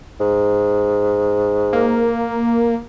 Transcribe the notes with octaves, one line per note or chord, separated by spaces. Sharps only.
G#2
A#3